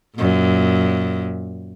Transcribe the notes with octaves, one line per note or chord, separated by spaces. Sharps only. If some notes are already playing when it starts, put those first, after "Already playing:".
F#2 A#2